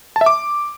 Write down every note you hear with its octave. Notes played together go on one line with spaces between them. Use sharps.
A5
E5
D6